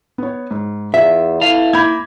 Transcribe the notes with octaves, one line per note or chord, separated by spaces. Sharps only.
B3 C#5
G#2
E2 F4 E5
E4 A4 B4 F5
A#3 B5 G6 G#6